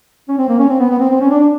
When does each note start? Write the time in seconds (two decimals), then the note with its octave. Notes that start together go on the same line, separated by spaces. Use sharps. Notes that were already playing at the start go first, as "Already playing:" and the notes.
0.28 C#4
0.38 C4
0.49 A#3
0.59 C#4
0.69 C4
0.79 B3
0.90 B3
1.00 C4
1.10 C4
1.21 C#4
1.31 D4
1.41 D4